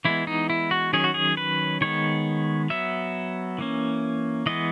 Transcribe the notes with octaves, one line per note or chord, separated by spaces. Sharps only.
E3 G#3 B3 E4
D#4
E4
F#4
D#3 F#3 C#4 G#4
F#4
G#4
B4
D#3 G#3 B3 C#5
F#3 B3 E5
E3 A#3 C#4
E3 G#3 B3 D#5